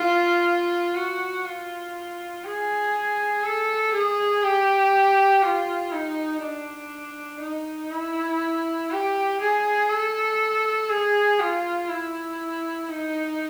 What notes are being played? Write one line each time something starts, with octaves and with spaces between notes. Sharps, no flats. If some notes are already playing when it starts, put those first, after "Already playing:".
Already playing: F4
F#4
F4
G#4
A4
G#4
G4
F4
D#4
D4
D#4
E4
G4
G#4
A4
G#4
F4
E4
D#4